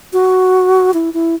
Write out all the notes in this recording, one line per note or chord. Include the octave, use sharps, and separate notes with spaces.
F#4
E4
E4